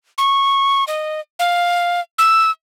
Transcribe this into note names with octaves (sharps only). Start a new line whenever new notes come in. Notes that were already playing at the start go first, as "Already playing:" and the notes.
C#6
D#5
F5
E6